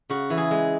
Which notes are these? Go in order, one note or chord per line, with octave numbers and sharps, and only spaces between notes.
C#3 F#4
E3
G#4
G#3